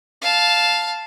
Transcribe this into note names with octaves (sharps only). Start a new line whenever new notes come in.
F5 A5